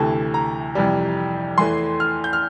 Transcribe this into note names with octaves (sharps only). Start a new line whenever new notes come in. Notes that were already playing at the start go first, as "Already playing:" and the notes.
Already playing: D2 C3 E3 A3 A5
A#5
F2 C3 E3 G3
E2 E3 A3 C6
F6
G6
F6